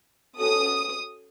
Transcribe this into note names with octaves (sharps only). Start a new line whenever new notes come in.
C#4 F#4 A4 D#6